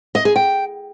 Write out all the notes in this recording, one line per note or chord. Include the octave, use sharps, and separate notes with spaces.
D#5
G#4
G5